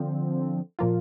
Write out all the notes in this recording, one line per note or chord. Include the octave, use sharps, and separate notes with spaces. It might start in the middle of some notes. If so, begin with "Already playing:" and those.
Already playing: D3 F3 C4
A#2 F3 A#3 F4